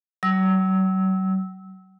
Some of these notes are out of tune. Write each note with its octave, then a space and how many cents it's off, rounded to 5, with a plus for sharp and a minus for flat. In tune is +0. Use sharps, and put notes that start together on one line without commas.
F#3 +45 E6 -25